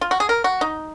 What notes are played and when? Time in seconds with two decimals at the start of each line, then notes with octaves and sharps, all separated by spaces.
0.01 F4
0.11 F#4
0.20 G#4
0.29 A#4
0.44 F#4
0.61 D#4